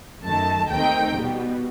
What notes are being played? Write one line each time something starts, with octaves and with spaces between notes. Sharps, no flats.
F#2 D#3 A3 A5
D#2 D#3 A3 C4 D#4 G5
B2 G3 B3